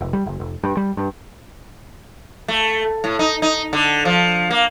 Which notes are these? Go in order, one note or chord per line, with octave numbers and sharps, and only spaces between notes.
F1
G3
F#1
F1
G2
G3
G2
A3
A2
D#4
D#4
D3
F3
A#3